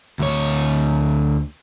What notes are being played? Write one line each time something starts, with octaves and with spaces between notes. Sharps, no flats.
D2 C#5